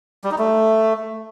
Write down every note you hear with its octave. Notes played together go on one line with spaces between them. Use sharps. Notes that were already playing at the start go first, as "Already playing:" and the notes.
G3
D#4
A3